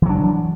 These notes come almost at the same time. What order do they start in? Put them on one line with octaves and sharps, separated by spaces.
E3 F#3 D4